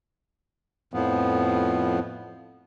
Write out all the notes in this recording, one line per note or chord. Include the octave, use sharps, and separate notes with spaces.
F2 A2 F3 B3